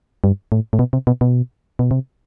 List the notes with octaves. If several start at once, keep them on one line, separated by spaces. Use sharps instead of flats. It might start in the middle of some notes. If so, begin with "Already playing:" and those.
G2
A2
A2
B2
C3
B2
B2
B2
C3